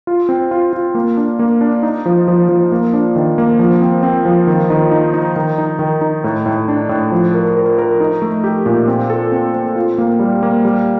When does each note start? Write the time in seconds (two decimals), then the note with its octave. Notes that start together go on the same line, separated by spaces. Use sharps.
0.07 F4
0.29 C4
0.51 F4
0.73 F4
0.95 A#3
1.17 D4
1.39 A#3
1.61 D4
1.83 D#4
2.06 F3
2.28 F3
2.49 F3
2.72 A#3
2.93 D4
3.16 D#3
3.38 A#3
3.59 F3
3.81 C4
4.03 C4
4.25 F3
4.47 D#3
4.70 D#3
4.91 D#4
5.14 D#4
5.36 D#3
5.58 D#4
5.79 D#3
6.01 D#4
6.24 A2
6.46 A2
6.68 D4
6.89 A2
7.12 F3
7.34 A#4
7.56 A#4
7.78 A#4
8.00 D#4
8.22 A3
8.44 G4
8.66 A#2
8.88 C4
9.10 A4
9.32 C4
9.54 C4
9.76 F4
9.98 A#3
10.19 G3
10.43 A#3
10.65 G3